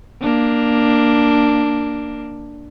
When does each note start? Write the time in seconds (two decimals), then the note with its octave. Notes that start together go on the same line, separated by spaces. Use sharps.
0.21 A#3 D4